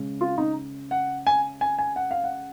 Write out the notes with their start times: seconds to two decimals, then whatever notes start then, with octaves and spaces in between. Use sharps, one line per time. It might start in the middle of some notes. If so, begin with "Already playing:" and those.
Already playing: C#3 G#3
0.21 F4
0.38 D#4
0.91 F#5
1.27 G#5
1.61 G#5
1.79 G#5
1.96 F#5
2.11 F5
2.24 F#5